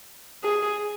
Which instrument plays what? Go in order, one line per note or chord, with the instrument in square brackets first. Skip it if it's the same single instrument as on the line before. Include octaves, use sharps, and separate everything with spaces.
[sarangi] G#4